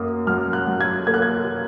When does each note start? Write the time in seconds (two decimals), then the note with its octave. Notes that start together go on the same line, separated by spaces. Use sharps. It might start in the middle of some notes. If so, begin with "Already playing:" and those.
Already playing: F#2 A#3 D#6
0.27 F#3 F6
0.53 F#6
0.67 F#3
0.81 G#6
1.07 A#3 G#6
1.14 F#6
1.22 G#6